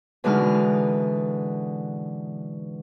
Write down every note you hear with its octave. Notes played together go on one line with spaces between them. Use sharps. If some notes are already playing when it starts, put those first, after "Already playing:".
B2 D3 E3 G#3 D#4 F6